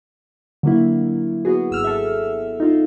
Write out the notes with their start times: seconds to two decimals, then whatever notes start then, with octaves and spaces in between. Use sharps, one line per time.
0.63 D3 F#3 A#3 E4
1.45 B3 F#4 G#4
1.70 G#1 E6 F6
1.84 A4 E5
2.60 D#4 F4